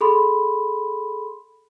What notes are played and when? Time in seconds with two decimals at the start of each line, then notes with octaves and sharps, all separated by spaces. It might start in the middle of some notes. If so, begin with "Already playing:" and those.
0.01 G#4 A4 B5 C6